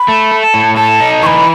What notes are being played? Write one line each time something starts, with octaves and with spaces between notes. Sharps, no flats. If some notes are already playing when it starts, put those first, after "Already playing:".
Already playing: B5
A3
A4
A2
A4 A5
D#4
E3 B5 C#6